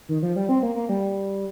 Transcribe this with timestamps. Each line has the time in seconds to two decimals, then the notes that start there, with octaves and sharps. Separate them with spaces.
0.09 D#3
0.22 F3
0.36 G3
0.49 C4
0.62 A#3
0.76 A#3
0.89 G3